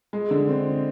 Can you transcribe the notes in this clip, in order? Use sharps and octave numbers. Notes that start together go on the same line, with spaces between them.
G#3
D3
C4